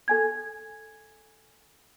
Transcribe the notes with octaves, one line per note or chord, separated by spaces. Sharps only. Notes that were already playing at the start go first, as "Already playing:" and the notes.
A4 G#5 G#6